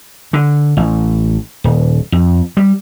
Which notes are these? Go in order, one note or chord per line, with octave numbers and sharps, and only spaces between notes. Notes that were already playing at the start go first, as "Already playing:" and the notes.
D3
A1
D#1
F2
G3